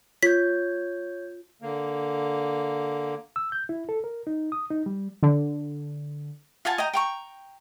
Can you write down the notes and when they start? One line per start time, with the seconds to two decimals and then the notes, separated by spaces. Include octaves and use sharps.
0.23 F4 C#5 G6 B6
1.62 D3 A#3
3.36 E6
3.52 G6
3.69 E4
3.89 A4
4.04 A#4
4.27 D#4
4.52 D#6
4.70 D#4
4.86 G3
5.23 D3
6.65 F4 F#5 G#5 A5
6.78 D#5 G5 A#5
6.94 G5 A#5 C#6